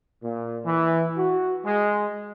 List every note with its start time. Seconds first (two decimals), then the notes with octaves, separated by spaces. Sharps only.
0.23 A#2
0.65 E3
1.17 F#4
1.65 G#3